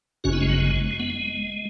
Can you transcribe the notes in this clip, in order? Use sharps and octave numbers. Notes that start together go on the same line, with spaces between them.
G#1 F#2 C#3 C#4 F#4
B3 E4
G#3 C#4
F#3 B3
G#3
G#3
B3
G#3